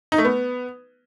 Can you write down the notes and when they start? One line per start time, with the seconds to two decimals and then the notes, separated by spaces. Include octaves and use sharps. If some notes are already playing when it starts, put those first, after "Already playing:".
0.12 D#4
0.18 A3
0.25 B3